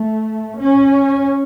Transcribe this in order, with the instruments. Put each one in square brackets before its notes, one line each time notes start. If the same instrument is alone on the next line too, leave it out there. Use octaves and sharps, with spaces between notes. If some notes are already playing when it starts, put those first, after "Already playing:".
Already playing: [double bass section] A3
C#4